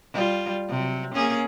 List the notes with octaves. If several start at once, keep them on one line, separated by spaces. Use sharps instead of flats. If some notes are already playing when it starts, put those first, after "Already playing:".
G3 F4
C3 F#3
A#3 C#4 G#4